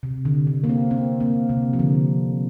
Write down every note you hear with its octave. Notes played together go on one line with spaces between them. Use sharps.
C3
D3
D3
A#3
C4
C4
A#3
C3
F3
D3